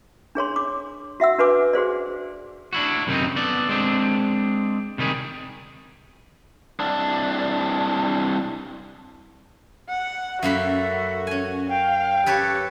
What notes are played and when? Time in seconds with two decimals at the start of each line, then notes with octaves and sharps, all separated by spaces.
0.35 D4 G#4 C#5 C6
0.56 D6
1.20 F#4 E5 F#5 E6
1.38 D4 F#4 B4 G#5 D6
1.73 F#4 G#4 C5 D5
2.73 D4 E4 F#4
3.07 F#2 C3 D#3 G3 C4 D#4
3.36 B3 A4 D5
3.69 G#3 C4 D4
4.98 C3 D#3 G3 G#4
6.80 C2 D4
9.89 F#5
10.43 F#2 A#3 F#4 A4 E5 B5
11.27 C#4 G#5
11.69 F5 G5
12.26 G4 A4 B4 C#5